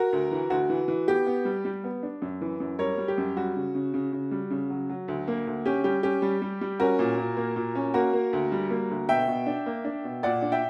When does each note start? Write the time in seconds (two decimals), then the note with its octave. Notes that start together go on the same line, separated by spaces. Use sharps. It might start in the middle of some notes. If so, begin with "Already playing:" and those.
Already playing: F#4 A#4
0.13 D2
0.31 E3
0.50 D2 F#4
0.70 E3
0.88 E3
1.08 B3 G4
1.27 B3
1.45 G3
1.65 G3
1.84 B3
2.03 D4
2.22 F#2
2.41 E3
2.60 F#2
2.79 G3 A#4 C#5
2.98 G3
3.08 G4
3.18 F#2
3.36 G3 F#4
3.56 C#3
3.75 C#3
3.94 C#3
4.13 C#3
4.31 G3
4.50 C#3
4.70 F#3
4.89 F#3
5.08 D2
5.28 A#3
5.47 D2
5.66 C#4 G4
5.84 G3 G4
6.03 C#4 G4
6.22 G3
6.42 G3
6.61 G3
6.80 C#4 F#4 A#4
6.99 A#2
7.18 A#2
7.37 A#3
7.56 A#2
7.75 C#4
7.94 A#3 F#4 A#4
8.13 A#3
8.33 D2
8.52 G3
8.70 A#3
8.90 D2
9.09 B2 E5 G5
9.28 B2
9.46 D4
9.66 A#3
9.85 D4
10.04 B2
10.23 A#2 D5 F#5
10.42 D4
10.52 E5 G5